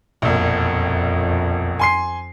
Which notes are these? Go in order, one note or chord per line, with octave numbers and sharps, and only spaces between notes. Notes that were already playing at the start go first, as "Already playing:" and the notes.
E1 A#1 F2
G#5 C6 C7